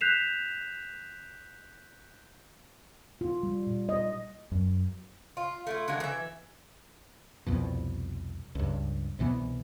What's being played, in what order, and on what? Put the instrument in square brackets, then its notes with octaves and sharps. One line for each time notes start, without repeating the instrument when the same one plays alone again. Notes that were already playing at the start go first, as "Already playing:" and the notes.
[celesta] F#6 G6 B6 C7 E7 F7
[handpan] F4
G3
A#2
D#5
[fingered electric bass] F#2
[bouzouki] F4
A3 E4 F4
D3 G#3 A#3 F#4
E3 E5
[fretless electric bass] C2 F2 B2
C#2 G2
C2 B2 E3 B3